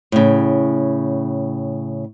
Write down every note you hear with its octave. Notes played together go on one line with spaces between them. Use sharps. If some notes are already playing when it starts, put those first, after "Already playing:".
A2 C#3